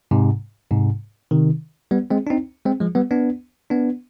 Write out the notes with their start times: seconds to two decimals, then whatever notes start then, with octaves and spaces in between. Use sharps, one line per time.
0.11 G#2 C3
0.71 G#2 C3
1.31 C3 D#3
1.91 G3 B3
2.10 G#3 C4
2.27 D4
2.30 C4 D#4
2.65 G#3 C4
2.80 F3 G#3
2.95 G3 B3
3.11 B3 D4
3.70 B3 D4